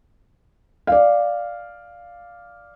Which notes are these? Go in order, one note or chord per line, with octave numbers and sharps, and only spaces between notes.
D5 F5